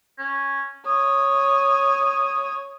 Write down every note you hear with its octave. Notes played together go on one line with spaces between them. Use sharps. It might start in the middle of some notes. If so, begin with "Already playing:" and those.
C#4
C#5 D#6